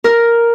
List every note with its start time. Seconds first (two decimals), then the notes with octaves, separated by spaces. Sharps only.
0.04 A#4